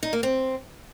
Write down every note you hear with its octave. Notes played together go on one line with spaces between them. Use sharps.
D#4
A#3
C4